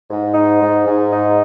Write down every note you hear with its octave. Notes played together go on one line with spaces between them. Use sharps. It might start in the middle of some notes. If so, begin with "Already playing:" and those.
G#2
D#4
G#2
G#2
D#4